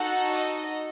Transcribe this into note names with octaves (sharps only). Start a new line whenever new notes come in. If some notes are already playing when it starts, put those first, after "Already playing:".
Already playing: D#4 F#4 A4 F#5
D#5